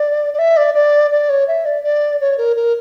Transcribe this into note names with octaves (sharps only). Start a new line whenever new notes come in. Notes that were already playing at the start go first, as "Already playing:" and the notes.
Already playing: D5
D5
E5
D5
D5
D5
C#5
E5
D5
D5
C#5
A#4
A#4